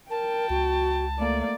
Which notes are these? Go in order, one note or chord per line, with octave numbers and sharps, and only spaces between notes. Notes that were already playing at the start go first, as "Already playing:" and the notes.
A#4 G5 A5
C#2 F#4
A3 A#3 D5